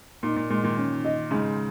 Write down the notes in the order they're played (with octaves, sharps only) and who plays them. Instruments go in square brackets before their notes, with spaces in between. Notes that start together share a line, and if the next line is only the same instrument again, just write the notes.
[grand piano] A#2 [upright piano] D#4
[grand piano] A#2
[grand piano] A#2 [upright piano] G#3
[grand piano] A#2 D#3
[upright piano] C#4
D#5
[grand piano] G#2 C#3 [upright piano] G#3